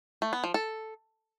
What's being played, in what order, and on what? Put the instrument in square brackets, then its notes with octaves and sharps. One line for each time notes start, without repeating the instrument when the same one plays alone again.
[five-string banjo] A3
B3
F3
A4